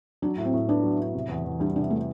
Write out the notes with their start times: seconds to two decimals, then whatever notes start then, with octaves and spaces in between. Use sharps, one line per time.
0.22 F#3 D4
0.38 A2
0.45 C4
0.53 A2
0.68 B3 D4
0.84 F#3
0.99 A2
1.14 C3
1.29 E2
1.45 E2
1.60 G3 D4
1.75 C3 D4
1.90 A3